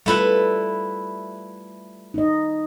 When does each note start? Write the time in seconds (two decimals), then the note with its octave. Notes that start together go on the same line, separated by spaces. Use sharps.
0.06 G3 A3 E4 F4 B4
2.14 D#4 D#5